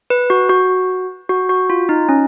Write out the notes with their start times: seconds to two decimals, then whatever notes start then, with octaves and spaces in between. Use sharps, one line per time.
0.10 B4
0.30 F#4
0.49 F#4
1.29 F#4
1.49 F#4
1.70 F4
1.89 D#4
2.09 C#4